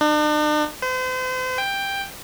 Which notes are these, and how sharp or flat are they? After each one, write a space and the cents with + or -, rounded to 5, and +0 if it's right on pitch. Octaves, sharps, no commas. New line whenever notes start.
D4 +45
C5 -40
G5 +10